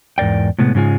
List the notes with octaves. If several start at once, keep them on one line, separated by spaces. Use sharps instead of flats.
E2 G#2 A#4 D5 G5
A2 C3 G#3 B3
G#2 C#3 G#3 F4 G#5